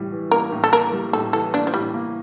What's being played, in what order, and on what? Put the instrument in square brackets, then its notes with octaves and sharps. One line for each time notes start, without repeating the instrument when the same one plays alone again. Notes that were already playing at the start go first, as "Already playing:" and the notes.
Already playing: [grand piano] A2 E3 G3
E3
[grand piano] A#3 [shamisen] A#4
[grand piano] A2
[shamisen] A4
[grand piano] A#3 [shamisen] A#4
[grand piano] G3
[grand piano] A2 [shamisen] A4
[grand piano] E3 [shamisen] A4
[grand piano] A#3 [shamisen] D4
[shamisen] F3
[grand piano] A2 [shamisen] G3
[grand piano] A#3